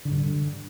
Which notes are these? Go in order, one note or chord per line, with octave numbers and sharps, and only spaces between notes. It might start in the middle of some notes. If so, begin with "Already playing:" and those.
D3
G2
D3